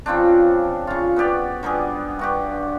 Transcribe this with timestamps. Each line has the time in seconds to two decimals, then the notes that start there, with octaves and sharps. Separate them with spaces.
0.06 C#3 F3 C4 D4
0.87 C#3 F4
1.16 B3 F#4 G4 D5
1.63 D3 G3 B3 G#4
2.19 G2 F#4 G4